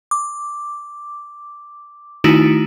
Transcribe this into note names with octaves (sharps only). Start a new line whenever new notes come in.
D6
D#3 A3 D#4 E4 F#4 D7